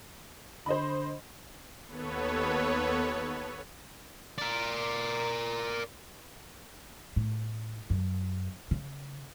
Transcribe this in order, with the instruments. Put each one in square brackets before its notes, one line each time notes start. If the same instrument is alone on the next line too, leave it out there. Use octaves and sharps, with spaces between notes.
[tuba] D3 [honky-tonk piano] C5 D#5 B5
[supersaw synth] D#2 B3 A4 B4 C#5
[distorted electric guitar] A#4 D5
[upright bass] A2
F#2
C#3